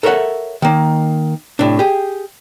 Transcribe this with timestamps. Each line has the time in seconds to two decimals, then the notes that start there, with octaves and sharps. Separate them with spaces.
0.03 A4 A#4 C#5 E5 F#5
0.62 D#3 A#3
1.59 A2 C3 D4
1.79 G4 G#4